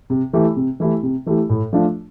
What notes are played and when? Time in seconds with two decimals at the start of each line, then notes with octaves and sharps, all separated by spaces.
0.10 C3
0.33 E3 A3 E4 G4
0.56 C3
0.80 E3 A3 E4 G4
1.03 C3
1.26 E3 A3 E4 G4
1.50 A2
1.73 F3 A3 D4 F4